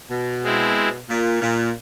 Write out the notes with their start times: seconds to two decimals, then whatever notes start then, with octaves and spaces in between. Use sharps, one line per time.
0.10 B2
0.43 G#3 C4 E4
1.09 A#2
1.41 A#2